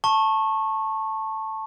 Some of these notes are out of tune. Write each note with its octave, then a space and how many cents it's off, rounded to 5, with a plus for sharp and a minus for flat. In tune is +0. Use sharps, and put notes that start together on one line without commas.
A5 +0 C#6 -20